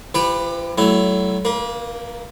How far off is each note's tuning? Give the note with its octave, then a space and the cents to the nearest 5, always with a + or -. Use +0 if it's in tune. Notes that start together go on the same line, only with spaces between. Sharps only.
F3 -40 G4 +20 B4 +0
F#3 +30 A3 -15 E4 +10
A#3 +0 B4 -45